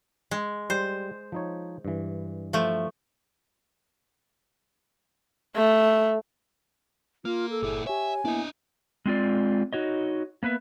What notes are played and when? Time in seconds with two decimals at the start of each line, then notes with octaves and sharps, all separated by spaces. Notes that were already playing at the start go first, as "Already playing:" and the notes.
0.31 G#3
0.70 G3 C5
1.32 F3 D#4 C#5
1.85 G2 E3
2.53 F3 A3
5.56 A3
7.25 A#3 F4 F6
7.50 A4
7.62 G1 A#2 E4 G#4 D6
7.87 G4 C#5 E5 G#5
8.25 A#3 B3 D4 E4 D#5
9.06 G#3 C4 F4 D5
9.73 D#4 F#4 C#5 D#5
10.43 A#3 B3 B4 E5